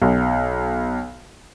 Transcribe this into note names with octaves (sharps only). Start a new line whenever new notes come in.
B1